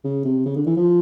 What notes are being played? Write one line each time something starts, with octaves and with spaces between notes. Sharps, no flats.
C#3
C3
C#3
D3
E3
F3